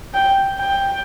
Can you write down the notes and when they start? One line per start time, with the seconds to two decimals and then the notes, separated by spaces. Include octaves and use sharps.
0.14 G5
0.60 G5